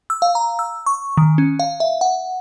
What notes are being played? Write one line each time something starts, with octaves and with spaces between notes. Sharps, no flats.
E6
F5
A#5
E6
C#6
D#3
C#4
F5
E5
F#5